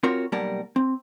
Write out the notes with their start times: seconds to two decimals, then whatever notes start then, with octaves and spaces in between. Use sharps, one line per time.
0.03 C4 F4 F#4 A#4 C#5
0.32 B1 G3 A#3 A#4 F#5 A5
0.76 C4